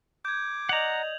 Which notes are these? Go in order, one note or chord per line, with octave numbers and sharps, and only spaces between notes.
D6 G6 G#6
D5 D#5 F#5 A#5 D#6 G6 F7 F#7